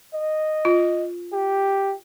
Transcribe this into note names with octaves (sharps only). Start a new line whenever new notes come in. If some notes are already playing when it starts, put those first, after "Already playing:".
D#5
F4
G4